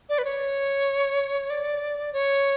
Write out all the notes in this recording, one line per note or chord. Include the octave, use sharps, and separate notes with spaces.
D5
B4
C#5
D5
C#5